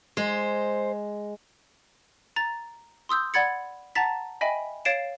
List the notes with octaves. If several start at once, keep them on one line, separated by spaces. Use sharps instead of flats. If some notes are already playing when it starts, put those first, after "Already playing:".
G#3 C5
A#5 A6
C6 D#6 E6 G6
D5 F#5 B5 G#6 A6 C#7
F#5 A5 A#5 A6 B6
D#5 E5 G5 G#5 B5
C#5 F5 A6 C7 D7 E7